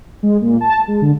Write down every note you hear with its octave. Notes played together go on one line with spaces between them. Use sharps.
G#3
A#2
A5
G#3
D3